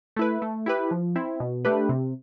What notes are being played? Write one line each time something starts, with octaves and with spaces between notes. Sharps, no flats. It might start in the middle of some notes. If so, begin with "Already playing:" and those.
A3 E4 B4
A3
E4 G4 B4
F3
C4 E4
B2
A3 D4 G4 B4
C3